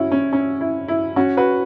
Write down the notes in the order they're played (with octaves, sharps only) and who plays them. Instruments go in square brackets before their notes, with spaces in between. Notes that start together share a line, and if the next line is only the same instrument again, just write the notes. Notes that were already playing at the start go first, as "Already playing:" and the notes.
Already playing: [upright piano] C#4 E4 F#4
C#4
C#4
E4
E4
C#4 F#4
F#4 B4